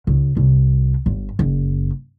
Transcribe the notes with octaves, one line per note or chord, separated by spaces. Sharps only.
C#2
C2
G1
F#1